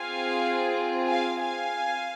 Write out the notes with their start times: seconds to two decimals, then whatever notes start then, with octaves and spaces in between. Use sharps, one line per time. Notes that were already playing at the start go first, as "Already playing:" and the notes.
Already playing: C4 F4 G#4 F5 G#5
1.09 F5 G#5
1.42 F5 G#5